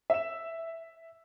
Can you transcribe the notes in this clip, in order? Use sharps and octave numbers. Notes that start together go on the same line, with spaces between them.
E5 E7